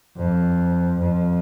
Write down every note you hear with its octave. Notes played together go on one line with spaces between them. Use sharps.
F2
F2